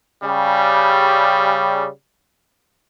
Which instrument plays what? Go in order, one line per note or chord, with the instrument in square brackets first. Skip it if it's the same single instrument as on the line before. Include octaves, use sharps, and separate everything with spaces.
[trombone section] C#3 G3